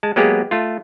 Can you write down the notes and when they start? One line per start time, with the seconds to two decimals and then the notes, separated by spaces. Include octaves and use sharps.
0.03 G#3 A5
0.16 F#3 G#3 A#3 B3 G4 G#4
0.51 A3 F4